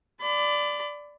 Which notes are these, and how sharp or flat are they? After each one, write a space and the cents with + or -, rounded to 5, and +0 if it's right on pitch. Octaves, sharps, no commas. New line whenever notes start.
D5 +0 B5 +35